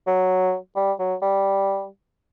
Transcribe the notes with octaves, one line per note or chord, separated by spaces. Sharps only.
F#3
G3
F#3
G3